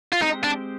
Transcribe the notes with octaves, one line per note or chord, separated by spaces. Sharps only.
F4
G#3 C4 D#4 G4 C5
D4